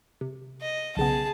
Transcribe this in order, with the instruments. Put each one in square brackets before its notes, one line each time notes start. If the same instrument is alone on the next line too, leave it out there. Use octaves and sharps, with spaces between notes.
[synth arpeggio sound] C3
[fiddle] D#5
[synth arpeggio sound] B1 C#3 B3 [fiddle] G#4 A5